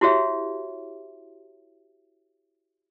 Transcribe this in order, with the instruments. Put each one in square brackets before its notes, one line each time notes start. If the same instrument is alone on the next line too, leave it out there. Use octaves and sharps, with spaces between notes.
[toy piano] E4 F#4 G4 C#5 E5